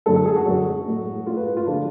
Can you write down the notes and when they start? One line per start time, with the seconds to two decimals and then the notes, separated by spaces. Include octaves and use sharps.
0.06 F#2 D3 G#3 A4
0.16 A4
0.26 G#4
0.36 F#4
0.46 F#2 D3 G#3
0.86 A2 G#3
1.26 A2 G#3 F4
1.37 B4
1.47 B4
1.57 F4
1.66 D3 F3 G#3 D4